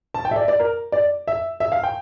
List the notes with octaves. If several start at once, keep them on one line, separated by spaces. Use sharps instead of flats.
A5
G5
E5
D5
D5
A#4
D5
E5
E5
F5
G5